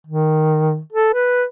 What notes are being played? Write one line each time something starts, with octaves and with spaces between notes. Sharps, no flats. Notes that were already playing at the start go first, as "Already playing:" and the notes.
D#3
A4
B4